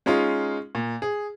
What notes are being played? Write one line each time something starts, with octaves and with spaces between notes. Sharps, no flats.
G#3 C#4 D#4 F4
A#2
G#4